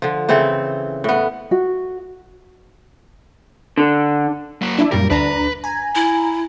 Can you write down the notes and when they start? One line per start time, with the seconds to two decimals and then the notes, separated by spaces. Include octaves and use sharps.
0.02 D3 F3
0.29 C#3 E3 C4 A4
1.04 A2 B3
1.51 F#4
3.77 D3
4.62 F#3 A#3
4.79 D4 E4
4.91 F#2 A#2 G3 A#4
5.10 D2 D4 B4 A#5
5.64 G#5 A#5
5.95 E4